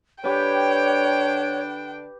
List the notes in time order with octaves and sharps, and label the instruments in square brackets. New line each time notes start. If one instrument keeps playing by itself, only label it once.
[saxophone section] D3 D4 [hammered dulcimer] G4 B4 [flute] C#5 [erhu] G5